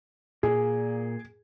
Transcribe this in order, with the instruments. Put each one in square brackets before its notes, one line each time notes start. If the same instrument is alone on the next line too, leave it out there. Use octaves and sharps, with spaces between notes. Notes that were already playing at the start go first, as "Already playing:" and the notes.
[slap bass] A#2 A#3 [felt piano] G#4